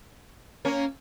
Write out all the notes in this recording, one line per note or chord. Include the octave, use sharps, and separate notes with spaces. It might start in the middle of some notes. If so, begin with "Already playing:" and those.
A#3 C#4